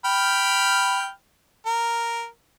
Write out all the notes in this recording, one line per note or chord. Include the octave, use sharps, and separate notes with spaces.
G5 B5 F6
A#4